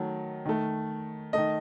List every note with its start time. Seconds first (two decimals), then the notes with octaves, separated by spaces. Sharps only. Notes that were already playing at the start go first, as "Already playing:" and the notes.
Already playing: D#3 F#3 A3
0.46 D#3 A3
1.33 D#3 A3 D#5